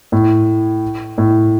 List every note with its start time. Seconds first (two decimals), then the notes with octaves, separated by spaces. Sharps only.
0.12 A2
1.18 A2